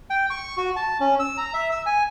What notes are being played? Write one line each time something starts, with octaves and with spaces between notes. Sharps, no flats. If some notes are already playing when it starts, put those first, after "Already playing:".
G5
C#6
F#4
A5
C#4
E6
A#5
E5
E6
G#5